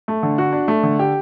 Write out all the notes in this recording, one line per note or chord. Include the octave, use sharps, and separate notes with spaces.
A3
D3
F#4
D4
A3
D3
G4